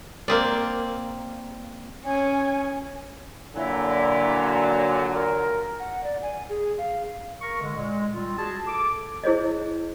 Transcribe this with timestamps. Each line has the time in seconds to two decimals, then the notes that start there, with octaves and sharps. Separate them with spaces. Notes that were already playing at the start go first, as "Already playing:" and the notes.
0.28 A#3 C4 D5
2.05 C#4 G#5
3.55 A#2 D3 F#3 E4
5.13 A#4
5.80 F#5
6.04 D5
6.22 G#5
6.49 G#4
6.78 F5
7.42 A#4 C#6
7.61 D3 G#3
7.75 A#2 G#3
8.12 G3 C4 F4
8.38 F#4 G#4 A5
8.67 A4 D6
9.24 E4 G#4 C5 C#5 D#5